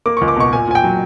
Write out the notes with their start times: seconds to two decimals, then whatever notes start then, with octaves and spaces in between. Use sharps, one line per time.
0.06 A#3 D6
0.17 C#6
0.21 C#2
0.28 D6
0.36 B2 C#6
0.52 A#2 G#5
0.67 A#2 G#5
0.75 G5
0.84 F#3